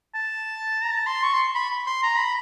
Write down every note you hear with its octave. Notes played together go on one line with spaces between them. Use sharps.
A5
A#5
A5
C6
C#6
C6
B5
C6
A#5
B5